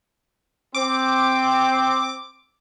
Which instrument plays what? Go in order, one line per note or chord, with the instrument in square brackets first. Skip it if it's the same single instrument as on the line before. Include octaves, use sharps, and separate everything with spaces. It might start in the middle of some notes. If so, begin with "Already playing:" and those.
[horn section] C4 [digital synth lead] D6